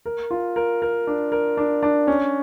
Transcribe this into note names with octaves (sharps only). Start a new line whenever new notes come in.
A#4
F4
A#4
A#4
D4
A#4
D4
D4
C#4